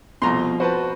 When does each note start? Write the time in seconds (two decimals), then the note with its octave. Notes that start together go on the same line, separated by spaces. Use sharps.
0.22 C2 F2 B2 A#5 C6
0.60 F#4 B4 C5 A5